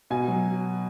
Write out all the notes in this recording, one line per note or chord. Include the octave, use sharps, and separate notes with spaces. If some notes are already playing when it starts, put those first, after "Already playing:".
B2 G#5
F#3